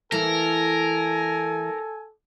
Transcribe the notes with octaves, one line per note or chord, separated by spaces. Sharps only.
E3 A3 A#3 A4 A#4 G#5